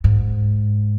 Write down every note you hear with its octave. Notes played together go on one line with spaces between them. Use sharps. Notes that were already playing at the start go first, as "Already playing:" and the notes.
G#2